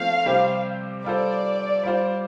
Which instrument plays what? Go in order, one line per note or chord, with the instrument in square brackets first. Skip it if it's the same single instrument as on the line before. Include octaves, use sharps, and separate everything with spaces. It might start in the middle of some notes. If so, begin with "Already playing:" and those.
Already playing: [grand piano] F3 A3 C4 [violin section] F5
[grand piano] C3 G3 C4 G4 C5
[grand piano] G3 F4 A4 C5 [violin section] D5
[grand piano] G3 F4 C5